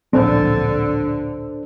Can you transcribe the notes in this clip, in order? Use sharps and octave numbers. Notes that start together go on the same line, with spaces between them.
D1 A#1 D3 C4 D4 A4 C5